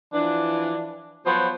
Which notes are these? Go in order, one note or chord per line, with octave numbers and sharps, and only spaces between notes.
E3 F3 D4
F3 F#3 B3 F#4 C5